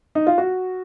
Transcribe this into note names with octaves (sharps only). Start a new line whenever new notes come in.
D#4
F4
F#4